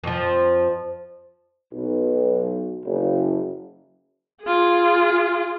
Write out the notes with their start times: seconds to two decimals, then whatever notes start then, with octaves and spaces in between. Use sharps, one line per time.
0.04 F2 F3
1.73 B1
2.84 F#1
4.44 F4 G#4